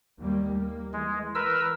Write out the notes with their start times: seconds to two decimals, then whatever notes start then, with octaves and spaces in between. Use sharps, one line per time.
0.19 D#2 G3 A#3
0.54 A#3
0.93 E3 G#3
1.35 A#4 B4 E6